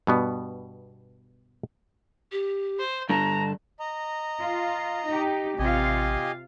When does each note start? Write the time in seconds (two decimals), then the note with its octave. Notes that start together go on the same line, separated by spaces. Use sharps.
0.07 G2 B2 B3
2.32 G4
2.80 C5
3.10 G2 D3 A5 A#5
3.79 D#5 A#5
4.41 F4
5.07 D#4 G4
5.59 A1 C3 F4 G4 D#5 F5 G#5